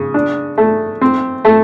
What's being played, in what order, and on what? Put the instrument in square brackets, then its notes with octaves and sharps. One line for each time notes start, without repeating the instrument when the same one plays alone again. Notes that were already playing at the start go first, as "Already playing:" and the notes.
Already playing: [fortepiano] C#3
D4
A3
C4
A3